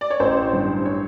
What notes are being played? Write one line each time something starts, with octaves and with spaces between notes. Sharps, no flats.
D5
C#5
A1 C5
G2
C#5